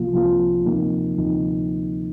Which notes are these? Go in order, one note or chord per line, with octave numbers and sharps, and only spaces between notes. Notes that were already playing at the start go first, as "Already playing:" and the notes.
Already playing: C2 C3 F3 A#3 F4
C2 C3 F3 A#3 F4
D2 C3 F3 A#3 D#4
D2 C3 F3 A#3 D#4